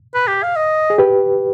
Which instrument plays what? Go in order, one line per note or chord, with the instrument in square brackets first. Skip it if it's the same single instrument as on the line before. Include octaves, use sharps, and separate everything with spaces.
[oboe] B4
G4
F5
D#5
[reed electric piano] G#4
G4 B4